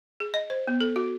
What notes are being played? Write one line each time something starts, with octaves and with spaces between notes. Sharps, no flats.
G#4
D#5
C5
B3
A4
F#4